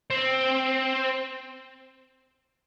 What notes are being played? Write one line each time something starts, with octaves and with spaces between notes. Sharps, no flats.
C4